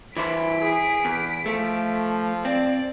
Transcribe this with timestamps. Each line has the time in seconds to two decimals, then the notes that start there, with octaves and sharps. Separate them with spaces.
0.17 E3 E4 C5 B6 D7
0.62 G#4
1.05 E2
1.46 F3 A3
2.45 C4 D5